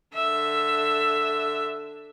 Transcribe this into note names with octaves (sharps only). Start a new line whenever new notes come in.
D3 E5